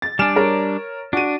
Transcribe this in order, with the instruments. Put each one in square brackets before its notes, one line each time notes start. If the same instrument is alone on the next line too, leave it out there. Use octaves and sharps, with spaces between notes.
[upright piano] A6
[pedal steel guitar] G3 D4 [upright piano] G#5 F6 E7
[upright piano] A#4 C#5
[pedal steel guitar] D4 [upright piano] F#4 D#7